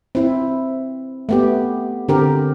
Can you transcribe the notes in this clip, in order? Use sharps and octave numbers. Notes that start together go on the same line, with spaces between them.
C4 E4
A3 B3 G4
D3 C4 G4 A#4